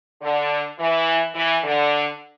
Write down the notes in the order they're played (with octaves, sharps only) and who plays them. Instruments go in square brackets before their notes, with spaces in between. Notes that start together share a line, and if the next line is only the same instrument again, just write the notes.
[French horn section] D3
E3
E3
D3